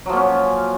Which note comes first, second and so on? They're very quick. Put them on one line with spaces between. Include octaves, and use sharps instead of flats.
F#3 F3 A#2 C#4